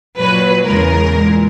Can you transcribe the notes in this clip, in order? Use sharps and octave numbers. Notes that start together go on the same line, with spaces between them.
A#2 F#3 B4
E2 C#3 G#3 A#4
A#2 G#3